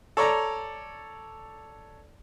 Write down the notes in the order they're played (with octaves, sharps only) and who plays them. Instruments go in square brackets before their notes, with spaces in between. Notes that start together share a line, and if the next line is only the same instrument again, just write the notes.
[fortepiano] A4 C#5 D5 A#5